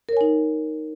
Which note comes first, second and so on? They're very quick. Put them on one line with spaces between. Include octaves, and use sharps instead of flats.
A#4 C#5 G#5 D#4